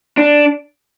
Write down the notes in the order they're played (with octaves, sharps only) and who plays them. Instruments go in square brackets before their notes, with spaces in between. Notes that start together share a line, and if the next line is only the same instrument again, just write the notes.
[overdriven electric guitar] D4